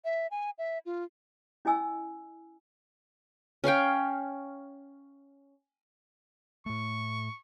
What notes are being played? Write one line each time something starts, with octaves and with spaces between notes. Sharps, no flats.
E5
G#5
E5
F4
C#4 E4 D#5 G#5 E6
C#4 C#5 F5 G5
A2 A3 C#6